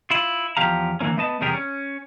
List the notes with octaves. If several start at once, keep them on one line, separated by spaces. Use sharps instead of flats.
E4 F4
E2 F3 G4 F5 A#5
D3 E3 A#3 C#4
A3 B3 D#5 A5
E2 C3 G3 G#4 A#4
C#4